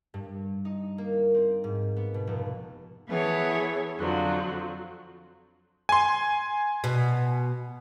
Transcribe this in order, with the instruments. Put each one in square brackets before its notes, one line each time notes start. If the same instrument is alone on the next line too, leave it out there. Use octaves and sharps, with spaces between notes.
[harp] G2
D#4
A#3
C4
G#2
B3
B2
F1
[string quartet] E3 B3 G#4 A4 C#5
F2 D3 F3 F#3
[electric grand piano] G#5 C6
[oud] B2